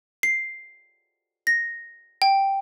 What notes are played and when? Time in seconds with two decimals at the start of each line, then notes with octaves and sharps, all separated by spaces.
0.23 C7
1.47 A#6
2.22 G5